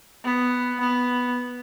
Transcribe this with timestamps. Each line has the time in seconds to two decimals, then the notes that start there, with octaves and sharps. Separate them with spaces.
0.24 B3
0.80 B3